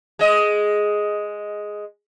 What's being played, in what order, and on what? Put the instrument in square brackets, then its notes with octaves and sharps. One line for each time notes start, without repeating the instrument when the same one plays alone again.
[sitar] G#3 D#5